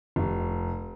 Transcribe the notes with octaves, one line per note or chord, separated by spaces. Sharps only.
F1